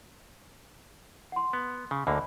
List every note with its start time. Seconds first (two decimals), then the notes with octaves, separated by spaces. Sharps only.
1.32 F#5 C6
1.53 B3
1.91 C#3
2.07 D2 D3 A#3 D#5 G#5 B5